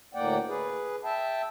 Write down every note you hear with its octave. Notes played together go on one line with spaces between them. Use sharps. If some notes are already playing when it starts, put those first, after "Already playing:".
D2 A2 A#3 D5 F#5 G5
G#4 B4
E5 G5 A5